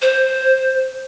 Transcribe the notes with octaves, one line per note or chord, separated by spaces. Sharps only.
C5